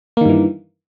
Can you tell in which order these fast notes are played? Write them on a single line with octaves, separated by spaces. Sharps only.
A#3 D#3 G2 E3